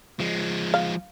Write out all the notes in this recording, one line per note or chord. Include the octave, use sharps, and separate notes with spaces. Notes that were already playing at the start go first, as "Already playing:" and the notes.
F3 G#3
F5